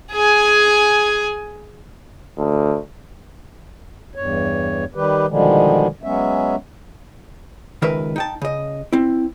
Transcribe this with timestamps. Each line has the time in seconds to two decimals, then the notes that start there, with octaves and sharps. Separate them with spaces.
0.12 G#4 G#5
2.38 D2
4.15 E2 G2 C#5
4.95 D#3 G3 G4 B4
5.28 B2 D3 D#3 F3 G3 G#3
6.03 F#3 G#3 B3 C#4 E5
7.82 C#2 D#3 A#4 B4 E5
8.16 D#4 G5 A5
8.42 C#3 D#5
8.93 C4 E4